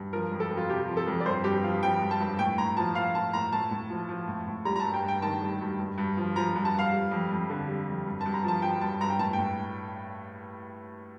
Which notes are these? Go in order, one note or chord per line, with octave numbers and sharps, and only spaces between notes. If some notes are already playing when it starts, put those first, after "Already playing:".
Already playing: G2
F3 A#4
F2
A4
F2
F4
C3 G4
F3
A4
F2
D5
G2 C5
G2 G4
F3 F5
F3 G5
G2
A5
G2
A2 G5
A2 A#5
F3 A5
F3 F5
A2 A5
A2 A#5
A2 A5
A2
F3
F3
A2
A2
G3 A#5
A#5
A5
G2
G5
G2
G5
D#3 A5
G3
G2
G2
G2
F3
F3 A#5
G2
A5
G2 F5
G3
F2
F2
D3
G3
F2
G2
A5
G2
A#5
F3 A5
F3 G5
G2 A5
G2 A#5
G5
A2 A5
G5
A2